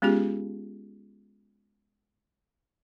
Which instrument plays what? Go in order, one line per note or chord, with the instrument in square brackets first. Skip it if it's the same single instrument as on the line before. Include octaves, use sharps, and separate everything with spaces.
[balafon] G#3 B3 C#4 F4 G4 G#4